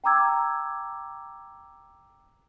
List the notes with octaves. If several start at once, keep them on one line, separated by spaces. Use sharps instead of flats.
G5 A5 A#5 D6 E6 G#6